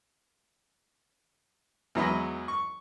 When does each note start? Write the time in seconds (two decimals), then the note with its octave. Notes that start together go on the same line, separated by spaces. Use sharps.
1.95 E2 E3 F#3 G#3 B4 D#5
2.48 C#6